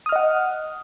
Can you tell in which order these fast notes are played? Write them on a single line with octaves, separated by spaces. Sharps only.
D#6 F6 D#5 F#5